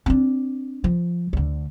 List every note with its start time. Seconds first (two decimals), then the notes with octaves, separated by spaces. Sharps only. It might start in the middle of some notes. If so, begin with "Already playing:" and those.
0.06 C4 D4
0.84 F3
1.33 D2 D3